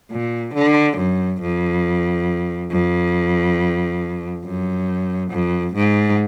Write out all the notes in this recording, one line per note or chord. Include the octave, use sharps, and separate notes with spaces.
A#2
D3
F#2
F2
F2
F#2
F2
G#2